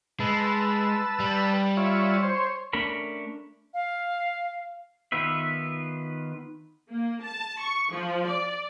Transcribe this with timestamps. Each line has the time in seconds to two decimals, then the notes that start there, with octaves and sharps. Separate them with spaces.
0.20 G#3 B4 A5 E6
1.20 G3
1.77 F4 C#5 E5
2.23 C5 C#5
2.73 A3 C#4 D4 A#4 B5
3.74 F5
5.12 D#3 B3 F4 B4 E5
6.90 A#3
7.22 A5
7.60 C#6
7.90 F3
8.27 D5